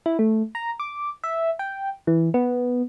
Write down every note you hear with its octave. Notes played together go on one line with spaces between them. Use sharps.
E4
A3
A#5
D6
E5
G5
E3
B3